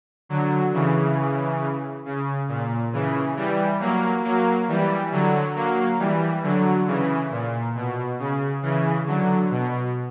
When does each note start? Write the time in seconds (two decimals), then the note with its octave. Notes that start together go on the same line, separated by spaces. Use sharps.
0.29 D3 F#3
0.73 C#3 E3
2.06 C#3
2.48 A#2
2.93 C#3 E3
3.37 E3 G3
3.80 F#3 A#3
4.24 F#3 A#3
4.68 E3 G3
5.12 D3 F#3
5.56 F#3 A#3
5.99 E3 G3
6.43 D3 F#3
6.87 C#3 E3
7.31 A#2
7.75 B2
8.19 C#3
8.63 C#3 E3
9.07 D3 F#3
9.51 B2